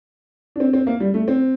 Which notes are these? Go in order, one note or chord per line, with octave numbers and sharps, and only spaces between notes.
D4
C4
C4
A#3
G3
A3
C4